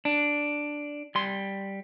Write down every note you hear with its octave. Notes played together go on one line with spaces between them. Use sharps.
D4
G3 C6